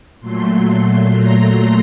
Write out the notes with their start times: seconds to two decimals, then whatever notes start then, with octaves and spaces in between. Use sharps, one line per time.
0.20 A#2 F#3 A3 C6
0.68 C6
1.16 A#5